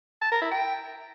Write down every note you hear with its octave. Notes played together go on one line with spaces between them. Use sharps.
A5
A#4
E4
G5